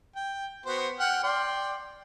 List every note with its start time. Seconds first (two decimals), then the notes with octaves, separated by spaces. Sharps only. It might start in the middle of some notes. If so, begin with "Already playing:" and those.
0.16 G5
0.66 B3 F#4 C5
1.00 F#5 G5 F6
1.23 D5 G5 C6